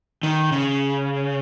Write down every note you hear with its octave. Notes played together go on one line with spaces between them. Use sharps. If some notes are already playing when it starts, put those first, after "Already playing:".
D#3
C#3